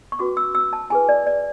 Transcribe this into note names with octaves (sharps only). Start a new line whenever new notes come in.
C#6
C#4 F#4 B4 D6
E6
E6
A5
E4 G#4 B4 G#5
D5
D5